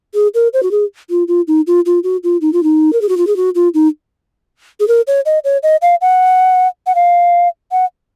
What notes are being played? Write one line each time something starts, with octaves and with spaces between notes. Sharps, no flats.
G#4
A#4
C5
F#4
G#4
F4
F4
D#4
F4
F4
F#4
F4
D#4
F4
D#4
A#4
G#4
F#4
F4
G#4
F#4
F4
D#4
G#4
A#4
C#5
D#5
C#5
D#5
F5
F#5
F#5
F5
F#5